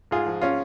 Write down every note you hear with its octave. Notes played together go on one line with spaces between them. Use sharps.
G#2 F4 G#4
F3
C#4 F4